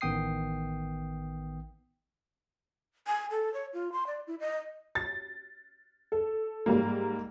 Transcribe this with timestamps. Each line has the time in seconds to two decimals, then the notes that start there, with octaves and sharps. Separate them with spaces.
0.01 A1 D#3 B3 G5 D#6 C7
3.07 G#5
3.31 A4
3.54 C#5
3.74 F4
3.92 C6
4.07 D5
4.27 E4
4.40 D#5
4.95 A6
6.12 A4
6.66 G#2 G3 A#3